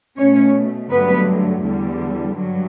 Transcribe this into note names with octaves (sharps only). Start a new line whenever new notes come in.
B2 A3 C#4 C#5
G2 D3 F#3 A3 B3 B4
E2 D3 G3
G2 F#3